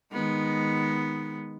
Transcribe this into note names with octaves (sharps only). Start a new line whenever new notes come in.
D#3 G#3 B3